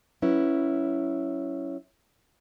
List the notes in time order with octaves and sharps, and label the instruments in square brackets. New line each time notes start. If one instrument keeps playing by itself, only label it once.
[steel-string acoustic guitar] F#3 C#4 E4 B4